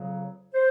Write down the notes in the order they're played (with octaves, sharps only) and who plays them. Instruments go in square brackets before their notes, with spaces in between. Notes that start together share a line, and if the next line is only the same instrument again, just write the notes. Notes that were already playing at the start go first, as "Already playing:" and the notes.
Already playing: [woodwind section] F2 C#3 F#3
C5